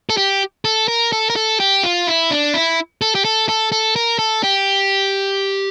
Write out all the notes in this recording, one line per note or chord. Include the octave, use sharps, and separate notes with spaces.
A4
G4
A4
A#4
A4
A#4
A4
G4
F4
E4
D4
E4
A4
G4
A4
A4
A4
A#4
A4
G4